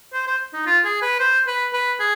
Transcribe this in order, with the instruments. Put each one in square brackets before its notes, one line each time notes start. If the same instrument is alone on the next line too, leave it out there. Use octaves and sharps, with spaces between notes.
[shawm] C5
C5
D#4
F4
G#4
B4
C5
B4
B4
G#4